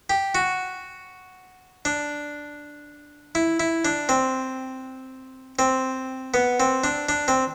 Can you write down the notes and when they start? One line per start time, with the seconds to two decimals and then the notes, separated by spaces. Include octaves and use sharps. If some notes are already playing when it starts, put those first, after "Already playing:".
0.10 G4
0.35 F#4
1.85 D4
3.35 E4
3.60 E4
3.85 D4
4.09 C4
5.59 C4
6.34 B3
6.60 C4
6.84 D4
7.09 D4
7.28 C4